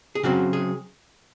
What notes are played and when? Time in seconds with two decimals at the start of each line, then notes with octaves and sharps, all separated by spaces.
0.15 G#4
0.23 C#3 F#3 C4 F#4
0.53 G#4